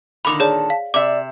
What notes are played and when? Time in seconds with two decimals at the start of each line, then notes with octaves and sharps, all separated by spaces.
0.25 A#2 D3 D#3 B5 D6 F7
0.40 G#4 C#5 D5 A5
0.70 F5
0.94 C3 D5 E5 D6